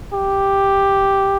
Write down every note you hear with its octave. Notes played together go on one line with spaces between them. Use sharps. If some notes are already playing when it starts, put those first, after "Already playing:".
G4